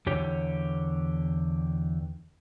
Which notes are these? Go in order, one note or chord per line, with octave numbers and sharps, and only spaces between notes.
E2 D3 G4 C#5